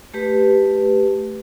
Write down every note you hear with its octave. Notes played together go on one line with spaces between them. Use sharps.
A3 G4 B4